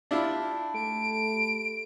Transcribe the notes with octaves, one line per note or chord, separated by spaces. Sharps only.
D4 E4 F4 G4 A5 B5
A3 D7